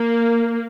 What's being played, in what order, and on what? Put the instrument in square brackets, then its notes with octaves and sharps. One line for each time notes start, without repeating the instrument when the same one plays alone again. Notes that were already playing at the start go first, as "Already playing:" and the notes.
Already playing: [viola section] A#3